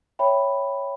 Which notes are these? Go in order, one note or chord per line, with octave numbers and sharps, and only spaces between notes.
C#5 E5 G5 B5